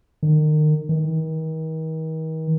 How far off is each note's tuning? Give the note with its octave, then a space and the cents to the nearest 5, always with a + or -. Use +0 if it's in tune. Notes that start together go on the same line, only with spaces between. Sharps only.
D#3 -30
D#3 +40